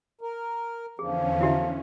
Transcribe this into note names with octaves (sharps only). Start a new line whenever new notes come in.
A#4
E2 D3 F3 C#4 G#4
E4 F#4 E5